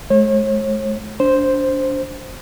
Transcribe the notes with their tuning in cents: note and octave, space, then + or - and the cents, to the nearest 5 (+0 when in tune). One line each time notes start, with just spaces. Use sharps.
G#3 +40 C#5 -40
D4 -25 C5 +0